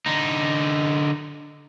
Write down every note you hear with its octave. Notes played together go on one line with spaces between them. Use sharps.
D3 D#4